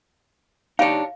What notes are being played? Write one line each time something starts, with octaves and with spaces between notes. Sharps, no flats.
G3 D4 D#4 G4 C#5 F5